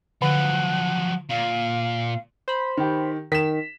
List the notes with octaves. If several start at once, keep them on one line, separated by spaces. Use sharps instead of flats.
D3 F3 F#3 F#5
A#2 F5
C5 B5
D#3 G4
D#3 B6 E7